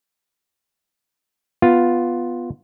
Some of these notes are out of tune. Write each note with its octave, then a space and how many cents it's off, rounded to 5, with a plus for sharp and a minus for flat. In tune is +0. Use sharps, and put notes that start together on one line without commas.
B3 +0 F4 +0